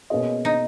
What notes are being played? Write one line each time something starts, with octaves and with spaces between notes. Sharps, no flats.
B2 A#3 C#4 G#4 D#5
D#4